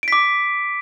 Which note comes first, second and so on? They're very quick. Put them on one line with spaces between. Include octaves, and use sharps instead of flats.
D7 B6 D6